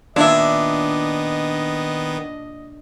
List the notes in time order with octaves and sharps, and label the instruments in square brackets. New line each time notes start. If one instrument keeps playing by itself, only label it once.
[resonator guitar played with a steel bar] A#2 E5 [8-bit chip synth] D#3 B3 [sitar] D4 [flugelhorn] D#5